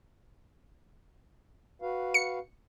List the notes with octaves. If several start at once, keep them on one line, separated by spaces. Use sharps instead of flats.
F#4 B4 F5
C#7